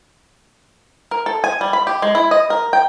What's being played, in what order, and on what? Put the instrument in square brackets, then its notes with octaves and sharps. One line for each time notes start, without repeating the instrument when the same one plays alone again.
[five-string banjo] A#4
A4
G#5
G3
B5
G4
G#3
E4
D#5
A#4
G5